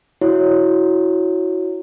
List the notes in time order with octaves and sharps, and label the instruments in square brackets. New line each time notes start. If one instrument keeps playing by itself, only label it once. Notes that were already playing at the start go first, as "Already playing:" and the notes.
[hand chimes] E4 F#4 C#5